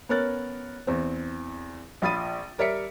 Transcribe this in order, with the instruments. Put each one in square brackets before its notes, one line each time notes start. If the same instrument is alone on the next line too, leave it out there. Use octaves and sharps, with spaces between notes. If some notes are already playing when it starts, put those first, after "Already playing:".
[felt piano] B3 C#4 A#4 C#5 F#6 A6
E2 C4
A#1 F4 B5 D#6 A6 D#7
G3 A#4 D5 E5 B6 C#7